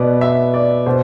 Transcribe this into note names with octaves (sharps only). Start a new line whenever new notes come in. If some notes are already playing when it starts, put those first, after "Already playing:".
Already playing: B2 B3 D5
E5
D5
B2 C5